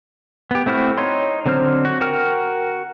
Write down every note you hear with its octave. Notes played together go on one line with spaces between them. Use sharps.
B3 G4
A3 C4 E4 F#4 F6
D#4 C#5 C6
D3 F#3 C4 C5 F6
F#4
F#4 A#4 G5 F6